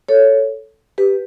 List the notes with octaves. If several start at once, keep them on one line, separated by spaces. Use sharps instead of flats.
A4 C#5
G4 B4